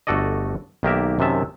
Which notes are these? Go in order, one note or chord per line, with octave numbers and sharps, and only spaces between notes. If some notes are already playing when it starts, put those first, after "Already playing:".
G1 A3 F#4 A4 D5 D#5
B1 D#3 A#3 G4 A#4 E5
F#2 C3 D#3 E5 A5